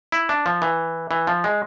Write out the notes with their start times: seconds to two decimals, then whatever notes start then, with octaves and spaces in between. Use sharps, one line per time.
0.12 E4
0.29 D4
0.46 F3
0.62 E3
1.11 E3
1.27 F3
1.44 G#3